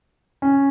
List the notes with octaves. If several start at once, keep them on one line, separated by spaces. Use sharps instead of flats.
C#4